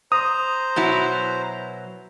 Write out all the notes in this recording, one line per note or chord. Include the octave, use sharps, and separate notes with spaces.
C5 A#5 D#6
B2 F#3 E4